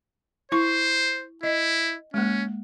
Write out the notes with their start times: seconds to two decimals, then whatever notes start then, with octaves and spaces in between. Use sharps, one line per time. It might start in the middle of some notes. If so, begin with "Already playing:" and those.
0.52 E4 C5 C#6
1.43 E4 D#5
2.14 G#3 A#3 C#4